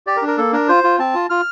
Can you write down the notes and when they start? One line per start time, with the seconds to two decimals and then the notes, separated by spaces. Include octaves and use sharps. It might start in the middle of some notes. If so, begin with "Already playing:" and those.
0.07 G4 D5
0.17 A#4
0.22 D4
0.27 A#4
0.38 A#3 A4
0.53 D4 A#4
0.68 F4 C5
0.84 F4
0.99 C4 A5
1.15 F4
1.30 F4 F6